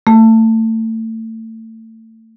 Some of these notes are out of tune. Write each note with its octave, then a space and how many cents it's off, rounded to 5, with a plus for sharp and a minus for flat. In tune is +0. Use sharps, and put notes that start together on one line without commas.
A3 +30